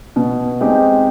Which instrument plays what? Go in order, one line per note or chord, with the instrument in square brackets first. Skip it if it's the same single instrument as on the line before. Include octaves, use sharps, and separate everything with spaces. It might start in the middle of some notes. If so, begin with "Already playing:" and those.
[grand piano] B2
G#3 C4 D#4 G4